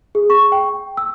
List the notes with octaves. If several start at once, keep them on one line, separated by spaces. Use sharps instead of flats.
G#4
C#6
G5
E6